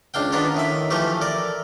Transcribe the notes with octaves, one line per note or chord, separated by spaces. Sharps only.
C#2 D4 F5 G5
D#3 B3 D4 F4 A#4
A2 D#3 E5
E3 F3 A3 G4
A4 A#4 D5